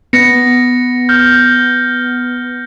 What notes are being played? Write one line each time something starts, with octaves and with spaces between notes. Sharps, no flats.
B3 A#6 C#7
F6 G6